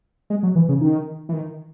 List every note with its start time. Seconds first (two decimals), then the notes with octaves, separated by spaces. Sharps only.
0.30 G#3
0.43 F#3
0.55 E3
0.69 C#3
0.81 D#3
1.29 E3
1.33 D#3